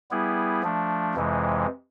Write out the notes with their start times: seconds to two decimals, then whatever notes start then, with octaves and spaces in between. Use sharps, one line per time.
0.11 G3 B3 E4 G#4
0.63 F3 A3 D4
1.15 F2 C3 E3 G#3